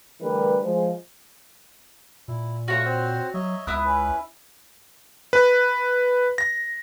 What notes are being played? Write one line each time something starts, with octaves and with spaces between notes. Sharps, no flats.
D3 E3 G3 A3 A#4 B4
F3 G#3
A#2 E4
A3 F4 F#4 C#5 C#6
C4 C5 F#5
F#3 C#5 D#5 E5
C#2 B3 E4 D#6 F#6
C#4 B4
B4
A#6